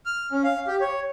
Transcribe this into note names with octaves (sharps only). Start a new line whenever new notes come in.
F6
C#4
F5
G4
C#5